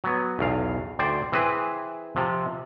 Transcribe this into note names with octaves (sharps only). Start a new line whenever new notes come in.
F#3 B3
B1 E2 F5
D2 C5 D5 G5
E3 C4 G#4 B4
C3 F3